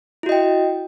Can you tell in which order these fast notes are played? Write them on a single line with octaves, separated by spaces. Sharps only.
E4 F#4 D#5 G5